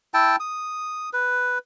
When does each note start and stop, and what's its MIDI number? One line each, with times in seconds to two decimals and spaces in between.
0.14 0.36 64
0.14 0.36 79
0.14 0.36 81
0.40 1.10 87
1.13 1.58 71